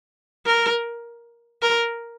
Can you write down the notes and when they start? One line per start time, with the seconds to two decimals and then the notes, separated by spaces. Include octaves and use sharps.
0.45 A#4
1.62 A#4